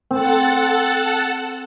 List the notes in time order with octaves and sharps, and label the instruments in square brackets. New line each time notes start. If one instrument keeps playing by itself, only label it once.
[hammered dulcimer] C4 [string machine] A4 F#5 A5